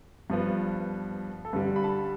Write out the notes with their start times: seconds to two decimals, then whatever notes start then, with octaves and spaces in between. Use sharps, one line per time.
0.30 G2 F3 B3
1.45 A4
1.53 G2 D3 G3 B4
1.76 B5
1.84 A5